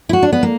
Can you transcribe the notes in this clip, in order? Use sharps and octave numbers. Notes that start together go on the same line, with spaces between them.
E4
F#4
D4
B3
A#3